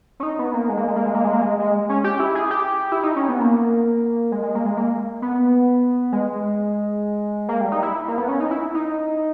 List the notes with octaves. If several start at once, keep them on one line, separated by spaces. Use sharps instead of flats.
C#4
D#4
B3
A#3
G#3
A#3
G#3
A#3
G#3
A#3
G#3
A#3
G#3
G#3
C#4
G4
E4
G#4
G4
E4
D#4
C#4
B3
A#3
G#3
G#3
A#3
G#3
A#3
B3
G#3
A#3
G3
D#4
E4
A#3
B3
C#4
D#4
E4
D#4